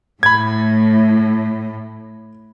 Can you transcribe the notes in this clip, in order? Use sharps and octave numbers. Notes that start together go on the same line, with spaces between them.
A2 B5 G#6